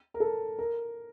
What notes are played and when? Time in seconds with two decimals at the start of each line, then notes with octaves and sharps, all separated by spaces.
0.14 A#4
0.20 A4
0.59 A#4